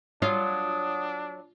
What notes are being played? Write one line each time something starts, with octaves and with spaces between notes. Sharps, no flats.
F#3 D4 F4 D#6